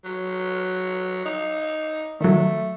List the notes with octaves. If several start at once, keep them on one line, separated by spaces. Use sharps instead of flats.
F#3
D#4
D#3 F#3 A3